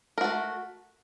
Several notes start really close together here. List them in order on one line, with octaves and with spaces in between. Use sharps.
A#4 F#4 A3